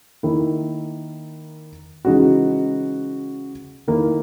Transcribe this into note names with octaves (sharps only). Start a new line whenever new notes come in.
D#3 A#3 E4
C#3 E3 G#3 D#4 F#4
D#3 A#3 E4